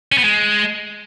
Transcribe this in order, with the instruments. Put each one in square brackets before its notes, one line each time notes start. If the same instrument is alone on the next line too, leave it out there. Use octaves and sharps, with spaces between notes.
[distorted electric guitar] C#4
B3
G#3